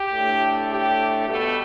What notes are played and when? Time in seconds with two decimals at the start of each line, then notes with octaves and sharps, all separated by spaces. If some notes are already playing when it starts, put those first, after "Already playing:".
Already playing: G4
0.13 A2 A3 D4
0.70 G4
1.28 B2 G3 A3 B3 A4